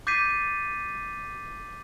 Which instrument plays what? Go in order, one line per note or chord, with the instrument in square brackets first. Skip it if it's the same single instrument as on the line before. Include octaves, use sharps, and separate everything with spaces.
[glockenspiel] D6 G6 A6 B6 C7 D#7